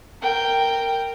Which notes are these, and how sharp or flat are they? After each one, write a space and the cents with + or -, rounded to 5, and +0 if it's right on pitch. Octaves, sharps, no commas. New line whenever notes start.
A#4 -10 G5 +0